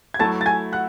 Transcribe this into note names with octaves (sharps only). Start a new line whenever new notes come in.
G#6
F#3 A3 E4 A5 A6
A6
G#5 G#6
F#5 F#6